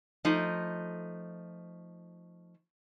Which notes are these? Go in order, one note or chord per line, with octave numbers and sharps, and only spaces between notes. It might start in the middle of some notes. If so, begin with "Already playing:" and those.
F3 A3 D#4